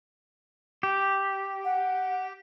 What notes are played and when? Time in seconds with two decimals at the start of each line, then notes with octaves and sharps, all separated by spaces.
0.83 G4
1.65 F#5